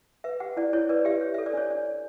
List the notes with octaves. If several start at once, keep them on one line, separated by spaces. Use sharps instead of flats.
B4 E5
G4 F#5
E4 D5
E4 C#5
B4 D5
G4 E5
C#5
E5
A4
D5
D4 C#5
D4 D5
C#5